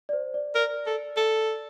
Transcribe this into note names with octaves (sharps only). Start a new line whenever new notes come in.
D5
C5
D5
A#4 D5
A4
A4